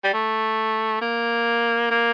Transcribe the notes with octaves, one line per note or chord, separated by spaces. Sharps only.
G3
A3
A#3
A#3